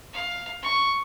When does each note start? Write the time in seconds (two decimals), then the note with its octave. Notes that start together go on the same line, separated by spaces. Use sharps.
0.13 F5
0.62 C#6